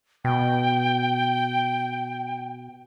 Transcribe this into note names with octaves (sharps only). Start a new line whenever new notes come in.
B2 G5